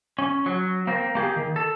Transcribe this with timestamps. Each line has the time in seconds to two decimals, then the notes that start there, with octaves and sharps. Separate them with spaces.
0.19 C#4
0.46 F#3
0.87 A#3 C4 A#4
1.15 A#3 G4 G#4
1.36 D#3
1.56 A4